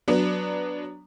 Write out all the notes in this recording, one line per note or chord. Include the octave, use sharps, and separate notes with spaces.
F#3 B3 D4